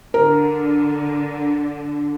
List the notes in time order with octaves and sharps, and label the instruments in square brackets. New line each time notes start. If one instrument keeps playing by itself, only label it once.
[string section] D3 [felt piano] A#4